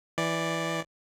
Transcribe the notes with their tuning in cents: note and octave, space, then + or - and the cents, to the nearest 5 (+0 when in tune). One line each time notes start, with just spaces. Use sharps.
E3 +0 D5 +0